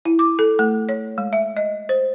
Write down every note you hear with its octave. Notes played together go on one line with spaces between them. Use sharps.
E4
D6
A4
A3
C#5
G#3
E5
D#5
C5